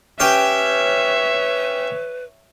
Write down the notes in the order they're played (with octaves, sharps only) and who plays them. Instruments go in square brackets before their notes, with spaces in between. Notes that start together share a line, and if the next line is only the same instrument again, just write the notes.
[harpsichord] C#4 G4 G5 [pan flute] B4 [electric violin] C#5 E5